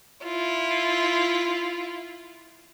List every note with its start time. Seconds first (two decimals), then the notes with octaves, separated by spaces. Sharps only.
0.25 E4 F4